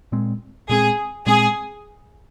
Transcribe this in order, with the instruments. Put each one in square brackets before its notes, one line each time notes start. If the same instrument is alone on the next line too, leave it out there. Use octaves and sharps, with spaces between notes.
[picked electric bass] A#2 G#3 C4
[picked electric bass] A#2 G#3 C4 [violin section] G#4
[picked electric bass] A#2 G#3 C4 [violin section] G#4